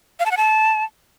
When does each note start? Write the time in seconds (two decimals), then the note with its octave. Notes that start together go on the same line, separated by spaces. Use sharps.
0.20 F5
0.26 A5
0.31 F#5
0.37 A5